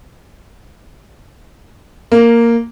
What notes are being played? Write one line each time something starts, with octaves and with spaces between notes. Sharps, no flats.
A#3